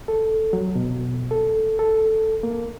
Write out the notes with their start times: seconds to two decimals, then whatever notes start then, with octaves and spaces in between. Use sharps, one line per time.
0.08 A4
0.53 F#3
0.75 B2
1.31 A4
1.79 A4
2.43 A#3